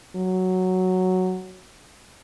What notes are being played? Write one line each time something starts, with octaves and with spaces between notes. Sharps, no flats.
F#3